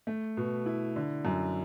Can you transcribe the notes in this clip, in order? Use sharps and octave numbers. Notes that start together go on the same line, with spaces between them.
A3
B2
E4
D3
F#2